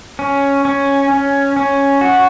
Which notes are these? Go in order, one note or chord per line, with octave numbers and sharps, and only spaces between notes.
C#4
C#4
C#4
C#4
F#4